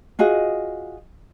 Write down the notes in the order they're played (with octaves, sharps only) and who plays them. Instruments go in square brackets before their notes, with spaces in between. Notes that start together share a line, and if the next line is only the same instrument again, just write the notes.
[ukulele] F4 F#4 G#4 D#5